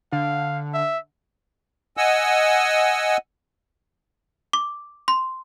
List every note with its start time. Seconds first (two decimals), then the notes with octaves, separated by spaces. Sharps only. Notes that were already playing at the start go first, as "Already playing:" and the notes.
0.12 D3 F5
0.74 E5
1.97 D#5 F#5 G#5 E6
4.53 D6
5.08 C6